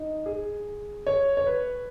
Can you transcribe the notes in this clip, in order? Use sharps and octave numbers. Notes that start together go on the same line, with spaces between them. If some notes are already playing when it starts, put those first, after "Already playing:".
Already playing: D#4
G#4
C#5
C#5
B4